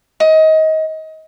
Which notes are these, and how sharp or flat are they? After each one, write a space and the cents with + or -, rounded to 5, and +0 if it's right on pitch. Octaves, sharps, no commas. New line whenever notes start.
D#5 +25